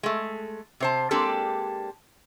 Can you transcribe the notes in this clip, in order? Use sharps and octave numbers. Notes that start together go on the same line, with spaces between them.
G#3 A3
C3 C5 A5
G#3 A#3 C4 D4 G4 A4